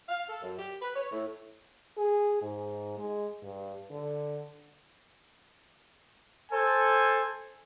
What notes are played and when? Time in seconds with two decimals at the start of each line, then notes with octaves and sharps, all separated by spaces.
0.09 F5
0.29 A4
0.43 F#2
0.59 G4
0.82 B4
0.95 C#5
1.12 A2
1.98 G#4
2.42 G#2
2.98 G#3
3.43 G2
3.90 D3
6.52 A4 C5 G#5